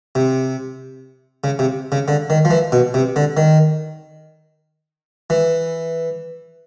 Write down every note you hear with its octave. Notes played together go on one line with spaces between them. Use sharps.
C3
C#3
C3
C#3
D3
D#3
F3
E3
B2
C3
D3
D#3
E3